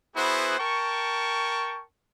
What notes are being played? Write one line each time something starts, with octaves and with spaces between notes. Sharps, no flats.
B3 E4 F#4 G#4 B4 C5
A#4 G5 A5 C#6